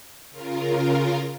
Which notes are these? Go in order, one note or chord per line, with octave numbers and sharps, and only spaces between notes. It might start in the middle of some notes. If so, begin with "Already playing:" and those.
C#3 F4 A#4